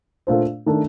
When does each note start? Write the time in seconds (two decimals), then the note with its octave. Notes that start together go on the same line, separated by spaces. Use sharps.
0.27 A#2 A3 D4 F4 C5
0.66 D#3 A3 D4